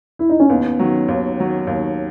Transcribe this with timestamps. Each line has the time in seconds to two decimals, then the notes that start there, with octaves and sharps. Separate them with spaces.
0.19 E4
0.29 D#4
0.40 C#4
0.49 D#2 B3
0.79 D#3 F#3
1.08 D#2
1.38 D#3 F#3
1.67 D#2